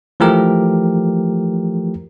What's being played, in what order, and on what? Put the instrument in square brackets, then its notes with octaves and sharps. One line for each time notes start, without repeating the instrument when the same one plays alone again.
[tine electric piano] E3 F3 A3 G4 A#4